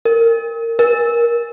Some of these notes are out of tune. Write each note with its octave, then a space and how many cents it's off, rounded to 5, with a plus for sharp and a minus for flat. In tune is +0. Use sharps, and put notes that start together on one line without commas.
A#4 -20
A#4 +20